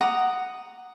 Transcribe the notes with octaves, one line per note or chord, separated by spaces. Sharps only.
F#5 A#5 D6 D#6